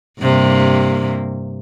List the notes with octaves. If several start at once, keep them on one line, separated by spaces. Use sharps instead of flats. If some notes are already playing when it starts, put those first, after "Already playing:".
G2 C3 A#3